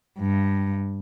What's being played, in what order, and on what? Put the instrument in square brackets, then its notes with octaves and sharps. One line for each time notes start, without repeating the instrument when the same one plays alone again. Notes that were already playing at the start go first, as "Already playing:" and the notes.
[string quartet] G2